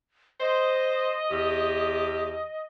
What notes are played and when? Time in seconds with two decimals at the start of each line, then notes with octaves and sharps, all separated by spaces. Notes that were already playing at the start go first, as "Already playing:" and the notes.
0.41 C5 D#5
1.31 E2 G4